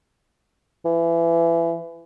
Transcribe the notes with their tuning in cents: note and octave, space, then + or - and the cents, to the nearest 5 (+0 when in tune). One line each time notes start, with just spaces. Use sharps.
E3 +25